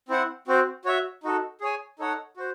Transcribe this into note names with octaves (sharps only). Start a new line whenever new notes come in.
C4 E4 C5 F#5
C4 F#4 C5
F#4 C#5 E5
D#4 F#4 A4
G#4 C#5 G#5
D#4 A4 C#5 F#5
F#4 C5